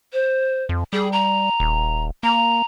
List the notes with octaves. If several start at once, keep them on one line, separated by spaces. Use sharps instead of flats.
C5
F2
G3 G#4
A#5
D#1
A#3 A#5